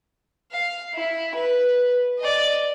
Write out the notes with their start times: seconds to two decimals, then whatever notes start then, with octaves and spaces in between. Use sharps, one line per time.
0.52 F5
0.95 E4
1.35 B4
2.19 D5 D#5